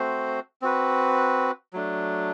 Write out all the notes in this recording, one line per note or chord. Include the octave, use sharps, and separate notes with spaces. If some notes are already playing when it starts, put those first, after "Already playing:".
Already playing: A3 C4 F#4 C5
C4 F#4 B4
F#3 A3 D4